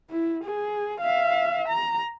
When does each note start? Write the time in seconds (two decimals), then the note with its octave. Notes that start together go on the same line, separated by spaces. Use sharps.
0.10 E4
0.44 G#4
1.01 E5 F5
1.68 A#5